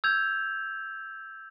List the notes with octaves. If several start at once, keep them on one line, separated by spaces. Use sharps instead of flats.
E6 G6 G#6 F7